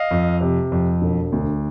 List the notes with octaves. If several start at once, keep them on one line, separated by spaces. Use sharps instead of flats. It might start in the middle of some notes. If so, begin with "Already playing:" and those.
Already playing: D#5 F5
F2
C3
F2
E1
D2